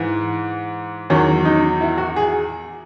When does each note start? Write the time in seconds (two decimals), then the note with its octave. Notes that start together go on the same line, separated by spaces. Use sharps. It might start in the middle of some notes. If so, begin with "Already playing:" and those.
Already playing: G#2 E3
1.10 E2 D#3 F#3 C#4
1.45 D#4
1.81 E4
1.98 F#4
2.16 G#4